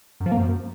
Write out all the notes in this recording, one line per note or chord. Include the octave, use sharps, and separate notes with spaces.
F#2
F3
A#3
F#2